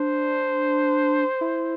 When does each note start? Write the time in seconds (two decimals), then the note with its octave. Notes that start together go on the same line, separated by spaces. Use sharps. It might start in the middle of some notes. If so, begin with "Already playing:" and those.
Already playing: D4 C5
1.41 E4